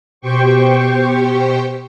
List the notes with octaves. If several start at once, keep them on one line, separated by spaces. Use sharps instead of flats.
B2 G4 C5 G5 C#6